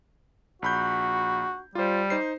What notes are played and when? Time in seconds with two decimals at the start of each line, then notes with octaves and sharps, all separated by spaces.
0.62 A#1 F#4 B5 G6
1.75 G3 F4 C5
2.10 D#4 C5 C7